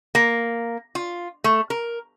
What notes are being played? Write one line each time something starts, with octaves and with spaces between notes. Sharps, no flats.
A#3
F4
A3
A#4